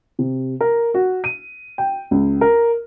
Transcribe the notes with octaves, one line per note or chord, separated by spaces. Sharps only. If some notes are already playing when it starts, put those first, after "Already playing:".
C3
A#4
F#4
D#7
G5
C#2
A#4